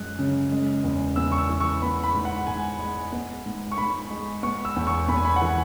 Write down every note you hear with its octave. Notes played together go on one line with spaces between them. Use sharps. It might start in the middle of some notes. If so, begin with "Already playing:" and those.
Already playing: F#2 G#3 F#6
C#3
G#3
E2
E2 E6
C#6
E6
E3
C#6
B3 B5
B5
G#2
F#5
G#2 G#5
G#3
B3
G#2
C#6
G#2 B5
G#3
B3 C#6
E6
E2
C#6
E2 B5
G#5
B5
F#5
E3 G#5